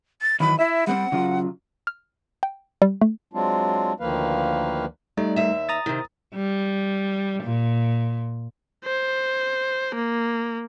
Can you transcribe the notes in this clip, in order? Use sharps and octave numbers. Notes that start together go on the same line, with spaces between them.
A6
D#3 E3 F#3 B5
E4 E5
G3 B3 C4 F#5
C#3 F#3 F4
F6
G5
G3
A3
F#3 G#3 C4 D4 F4
D2 D#3 F3 A#3 B4 F5
G3 A3 D#4 D5
D#2 E5
A#5 D#6 A6
C3 D#3
G3
A#2
C5
A#3